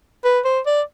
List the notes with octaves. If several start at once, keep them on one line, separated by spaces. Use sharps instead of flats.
B4
C5
D5